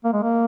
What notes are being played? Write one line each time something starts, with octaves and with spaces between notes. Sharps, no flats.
A#3
G#3
A#3